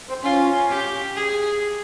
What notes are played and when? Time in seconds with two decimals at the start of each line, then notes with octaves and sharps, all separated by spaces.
0.09 C4
0.23 C#4 F4
0.70 G4
1.15 G#4